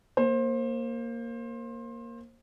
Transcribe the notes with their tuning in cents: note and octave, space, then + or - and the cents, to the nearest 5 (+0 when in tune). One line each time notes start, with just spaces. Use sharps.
A#3 +0 C5 +25